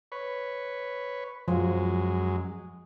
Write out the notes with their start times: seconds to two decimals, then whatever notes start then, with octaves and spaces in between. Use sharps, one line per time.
0.12 B4 C#5
1.48 F#2 F3 G#3